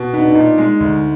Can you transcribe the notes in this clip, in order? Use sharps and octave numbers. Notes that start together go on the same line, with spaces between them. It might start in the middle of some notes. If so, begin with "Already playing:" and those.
Already playing: B2
B3 D#4
D4
D#4
A#2
G#3
D2